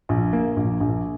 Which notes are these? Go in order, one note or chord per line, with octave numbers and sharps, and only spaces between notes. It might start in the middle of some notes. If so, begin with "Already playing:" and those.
A#1
A#3
A#1
A#1